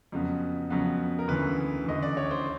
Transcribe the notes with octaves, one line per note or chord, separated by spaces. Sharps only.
F2 C#3 F#3 B3
F2 C#3 F#3 B3
A#4
D2 C#3 E3 B4
D2 C#3 E3 D#5
D5
C#5
C5